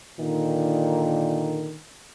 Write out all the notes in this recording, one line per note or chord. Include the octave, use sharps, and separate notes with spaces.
A#2 D3 D#3